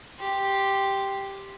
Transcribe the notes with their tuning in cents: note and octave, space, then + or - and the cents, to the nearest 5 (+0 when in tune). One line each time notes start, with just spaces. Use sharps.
G4 +0 C6 +0